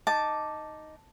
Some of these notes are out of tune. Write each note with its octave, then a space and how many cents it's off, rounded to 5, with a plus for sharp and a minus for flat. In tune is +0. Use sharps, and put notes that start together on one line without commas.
D#4 +0 A5 +0 D6 +0